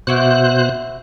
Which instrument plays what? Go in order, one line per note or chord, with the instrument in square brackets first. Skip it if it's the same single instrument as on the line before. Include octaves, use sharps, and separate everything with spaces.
[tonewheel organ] B2 C5 F#6 [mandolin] E4 F#4 D5